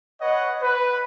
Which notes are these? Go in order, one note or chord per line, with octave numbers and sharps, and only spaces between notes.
B4 C#5 D#5 F#5
B4